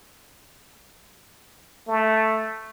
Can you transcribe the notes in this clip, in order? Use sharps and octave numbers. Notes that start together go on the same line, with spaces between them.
A3